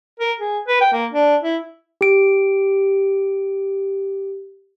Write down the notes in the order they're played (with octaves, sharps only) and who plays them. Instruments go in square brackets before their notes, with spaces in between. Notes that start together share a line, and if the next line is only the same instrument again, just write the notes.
[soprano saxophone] A#4
G#4
B4
G5
A#3
D4
E4
[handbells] G4 D7